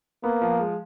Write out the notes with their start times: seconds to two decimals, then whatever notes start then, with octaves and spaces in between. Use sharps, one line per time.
0.24 A#3 B3
0.42 F3
0.60 G#3